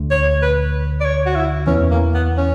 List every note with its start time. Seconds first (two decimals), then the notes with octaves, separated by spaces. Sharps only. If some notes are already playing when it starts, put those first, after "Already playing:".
Already playing: D2 D3
0.11 C#5
0.42 B4
1.00 D5
1.05 C#5
1.26 F#4
1.36 E4
1.67 E2 E3 C#4
1.91 A#3
2.14 B3
2.37 C#4